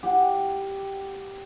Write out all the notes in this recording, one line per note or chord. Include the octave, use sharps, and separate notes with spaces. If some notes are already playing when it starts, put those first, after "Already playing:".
G4 F#5